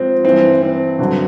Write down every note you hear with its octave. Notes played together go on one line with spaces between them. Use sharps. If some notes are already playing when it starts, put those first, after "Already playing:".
Already playing: G#2 F3 C4
G2 E3 C4
C4
G2 D3 F#3